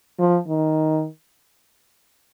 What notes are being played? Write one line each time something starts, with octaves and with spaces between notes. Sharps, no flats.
F3
D#3